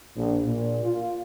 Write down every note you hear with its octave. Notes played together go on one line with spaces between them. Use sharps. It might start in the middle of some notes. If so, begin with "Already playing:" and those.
A#1
A#2
F4